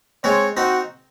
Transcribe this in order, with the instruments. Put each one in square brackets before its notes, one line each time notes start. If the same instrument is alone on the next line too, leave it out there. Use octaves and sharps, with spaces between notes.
[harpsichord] G#3 C4 [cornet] C#5
[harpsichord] C4 D#4 [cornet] F#4